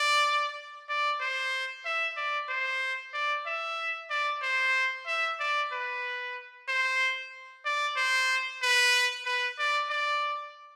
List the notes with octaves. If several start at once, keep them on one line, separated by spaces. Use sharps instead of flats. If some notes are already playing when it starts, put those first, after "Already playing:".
Already playing: D5
D5
C5
E5
D5
C5
D5
E5
D5
C5
E5
D5
B4
C5
D5
C5
B4
B4
D5
D5